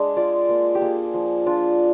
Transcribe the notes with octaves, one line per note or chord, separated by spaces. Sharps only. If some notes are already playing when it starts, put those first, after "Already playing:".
Already playing: G#3 D4
F4 D5
A#3
G4
A#3 G#4
F3
D4 F4